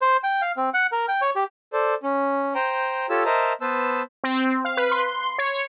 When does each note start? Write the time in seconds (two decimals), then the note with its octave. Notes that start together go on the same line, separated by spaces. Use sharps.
0.02 C5
0.24 G5
0.42 F5
0.57 C4
0.74 F#5
0.92 A#4
1.08 G5
1.22 C#5
1.36 G4
1.73 A4 C5 D5
2.03 C#4
2.55 C5 G5 A#5
3.10 F4 G4 A4 C#5 A5 E6
3.25 A#4 C5 D#5 E5 A5 A#5
3.61 B3 B4 C5 A5 E6
4.24 C4
4.65 F5
4.77 B4
4.92 C6
5.38 C#5